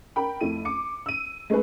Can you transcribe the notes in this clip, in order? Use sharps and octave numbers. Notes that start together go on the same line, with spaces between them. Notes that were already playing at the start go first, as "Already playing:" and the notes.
A#4 G5 B5
F2 A3 E4 D#7
D6 C#7
E6 D#7
G#3 A3 C#4 G#4 B4